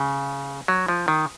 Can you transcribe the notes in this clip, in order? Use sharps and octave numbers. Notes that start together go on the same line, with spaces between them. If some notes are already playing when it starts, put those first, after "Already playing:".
Already playing: C#3
F#3
F3
D#3